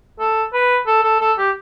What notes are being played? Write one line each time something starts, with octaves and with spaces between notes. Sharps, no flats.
A4
B4
A4
A4
A4
G4